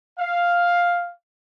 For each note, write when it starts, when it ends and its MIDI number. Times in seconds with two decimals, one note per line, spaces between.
0.18 1.11 77